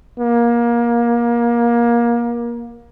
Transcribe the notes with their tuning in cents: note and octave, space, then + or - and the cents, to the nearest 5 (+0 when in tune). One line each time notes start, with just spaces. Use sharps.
A#3 +25